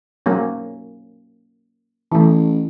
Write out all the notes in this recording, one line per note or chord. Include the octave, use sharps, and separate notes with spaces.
F#3 A#3 C#4
A1 E3 A3